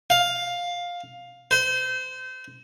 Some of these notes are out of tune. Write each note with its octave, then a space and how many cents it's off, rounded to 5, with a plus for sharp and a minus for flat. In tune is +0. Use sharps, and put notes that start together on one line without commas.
F5 +10
C5 -30